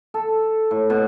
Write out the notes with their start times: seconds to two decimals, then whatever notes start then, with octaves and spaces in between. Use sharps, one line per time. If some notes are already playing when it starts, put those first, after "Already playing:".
0.14 A4
0.71 A2
0.90 B2